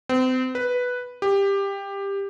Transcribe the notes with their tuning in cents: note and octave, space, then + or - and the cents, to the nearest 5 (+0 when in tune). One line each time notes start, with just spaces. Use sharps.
C4 -35
B4 +0
G4 +15